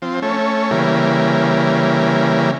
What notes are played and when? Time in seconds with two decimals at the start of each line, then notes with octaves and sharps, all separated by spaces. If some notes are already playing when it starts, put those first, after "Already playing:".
0.02 F3 C4
0.22 A3 C#4
0.71 C#3 E3 G3 A#3